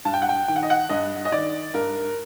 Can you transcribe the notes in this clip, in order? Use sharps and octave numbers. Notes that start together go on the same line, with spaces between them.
G2 A5
G5
F#5
G5
D#3 G5
F#5
D#5
F#5
G2 D#5
D#5
D#3 D5
G2 A#4